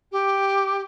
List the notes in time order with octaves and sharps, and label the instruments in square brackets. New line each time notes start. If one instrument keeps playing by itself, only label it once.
[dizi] G4